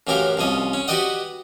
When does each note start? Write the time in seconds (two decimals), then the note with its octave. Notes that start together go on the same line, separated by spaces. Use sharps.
0.07 A1 F#2 F#3 G4 A#4 F5
0.37 C2 F3 C#4 D#5
0.73 C#4
0.88 F#4 G4 B4 D5 D#5 F#5